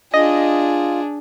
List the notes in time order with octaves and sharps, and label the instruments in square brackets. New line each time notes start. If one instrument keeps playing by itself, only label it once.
[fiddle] D4 G#4 [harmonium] F4 [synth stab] D#5